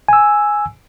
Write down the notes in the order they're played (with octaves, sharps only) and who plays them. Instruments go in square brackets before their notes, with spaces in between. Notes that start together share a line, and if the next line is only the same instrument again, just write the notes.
[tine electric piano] G#5 E6